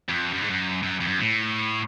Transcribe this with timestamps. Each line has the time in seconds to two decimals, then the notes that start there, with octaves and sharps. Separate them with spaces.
0.09 F2
0.33 F#2
0.42 G#2
0.50 F#2
0.83 F#2
1.00 F2
1.07 F#2
1.19 A2